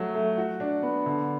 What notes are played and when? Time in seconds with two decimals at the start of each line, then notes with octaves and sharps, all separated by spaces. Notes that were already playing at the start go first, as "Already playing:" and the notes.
Already playing: F#3 A3
0.14 A3
0.37 F#4
0.60 D4
0.83 B3
1.06 D3